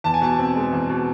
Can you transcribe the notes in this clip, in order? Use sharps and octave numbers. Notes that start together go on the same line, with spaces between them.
E2 A5
G#5
B2 A5
C4
G#3
E2
B2